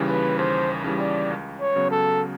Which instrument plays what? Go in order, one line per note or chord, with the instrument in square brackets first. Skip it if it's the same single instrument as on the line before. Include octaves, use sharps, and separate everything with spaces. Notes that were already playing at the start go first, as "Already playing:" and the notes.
Already playing: [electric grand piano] D#2 C#3 E3 G3
[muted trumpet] B4
[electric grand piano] D#2 [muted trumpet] C5
[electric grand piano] C#3 E3 G3
[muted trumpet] D5
[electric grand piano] C#2
[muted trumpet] C#5
[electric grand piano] C#3 F#3 B3
[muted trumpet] A4